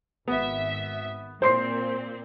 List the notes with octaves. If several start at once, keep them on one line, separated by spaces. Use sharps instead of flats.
G#1 B3 E5
A#2 C4 C5 C6 C7